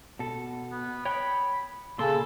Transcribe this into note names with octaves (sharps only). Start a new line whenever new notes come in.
B2 A4
B3
C#5 G5 B5
A#2 C#3 A#3 A4 C6